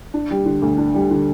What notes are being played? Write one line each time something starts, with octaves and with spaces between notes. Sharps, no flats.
D4
G3
D3
D2
D4
G3
D3